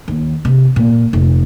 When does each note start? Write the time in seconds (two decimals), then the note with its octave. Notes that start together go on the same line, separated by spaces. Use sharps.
0.08 D#2
0.45 C3
0.76 A#2
1.13 F1